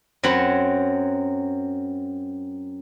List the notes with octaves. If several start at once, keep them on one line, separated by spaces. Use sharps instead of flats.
F#2 F#3 C4 F#5 B5